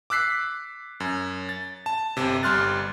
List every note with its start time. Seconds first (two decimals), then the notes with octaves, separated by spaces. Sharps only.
0.10 D6 E6 F#6 B6 C7
1.00 F#2
1.49 A6
1.86 A5
2.17 G1 C3
2.43 G1 G3 C6 F6 F#6 A6